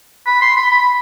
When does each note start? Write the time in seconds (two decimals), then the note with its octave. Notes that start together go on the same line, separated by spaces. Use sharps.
0.26 B5
0.42 C6
0.56 B5
0.71 B5